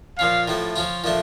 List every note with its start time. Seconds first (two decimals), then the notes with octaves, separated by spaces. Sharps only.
0.18 A#2 F3 C#4 F5
0.48 A2 F3 A3
0.76 F3 C#4 F4
1.04 A#2 F3 A3 D4